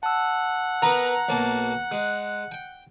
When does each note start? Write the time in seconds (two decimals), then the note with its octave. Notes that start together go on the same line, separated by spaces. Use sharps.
0.03 F#5 A5 E6
0.82 B3 A#4 B4 A#5
1.29 B1 A#3 C#5 A5
1.91 G#3 F#6
2.52 G5